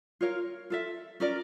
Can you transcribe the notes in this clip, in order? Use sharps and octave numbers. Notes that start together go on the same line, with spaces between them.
F4 A#4 C#5 F5
F4 A4 E5
C#4 F4 A#4 D5